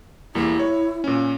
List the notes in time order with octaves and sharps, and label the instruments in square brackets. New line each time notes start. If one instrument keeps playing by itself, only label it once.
[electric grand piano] E2 G3 A#3 [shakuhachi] E4
[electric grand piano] C#5
A#2 C#4